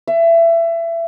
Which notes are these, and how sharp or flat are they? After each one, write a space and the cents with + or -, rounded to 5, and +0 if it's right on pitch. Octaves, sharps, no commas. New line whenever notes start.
E5 +25